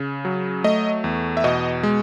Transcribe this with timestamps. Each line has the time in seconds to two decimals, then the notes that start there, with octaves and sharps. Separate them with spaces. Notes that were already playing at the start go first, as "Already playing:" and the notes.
Already playing: C#3
0.25 F#3
0.64 A3 D#5
1.04 E2
1.37 E5
1.44 B2 D#5
1.83 G#3